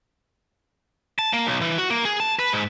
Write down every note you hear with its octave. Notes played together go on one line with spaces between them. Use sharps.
A5
A#3
B1
E3
F#4
A#3
G#4
A5
B4
G#2